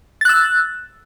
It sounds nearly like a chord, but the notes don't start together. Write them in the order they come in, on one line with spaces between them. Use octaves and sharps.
A6 F#6 E6